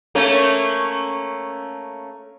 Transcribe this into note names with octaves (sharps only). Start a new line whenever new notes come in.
A3 A#3 C#4